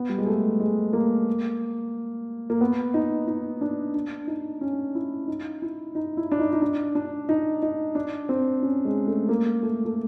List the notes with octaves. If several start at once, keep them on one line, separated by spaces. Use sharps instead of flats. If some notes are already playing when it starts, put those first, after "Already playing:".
Already playing: B3
G3
G#3
A3
G#3
A#3
A#3
B3
D#4
D#4
D4
D4
D#4
C#4
E4
D#4
E4
D#4
E4
D4
D#4
D#4
D4
D4
D#4
D#4
D4
C4
C#4
G#3
A3
A#3
A3
A3